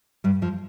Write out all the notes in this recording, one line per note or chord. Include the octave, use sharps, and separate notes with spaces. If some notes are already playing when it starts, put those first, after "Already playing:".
G2 G3
F2 F3